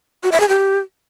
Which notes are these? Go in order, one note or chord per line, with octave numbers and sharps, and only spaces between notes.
F#4
E5
G#4
G4